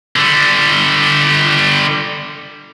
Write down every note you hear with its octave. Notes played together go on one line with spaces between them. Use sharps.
D3 G3